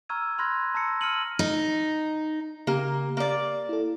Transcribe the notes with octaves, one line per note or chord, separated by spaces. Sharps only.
A#5 C#6 E6 F6 G#6 D#7
B5 C6 F6 F#6 G#6 A#6
A5 A#5 E6 A#6 C7 C#7
E6 F6 A#6 C#7 D#7 F#7
D#4
C#3 A#3 G4 A#5
A#3 D5
E4 A4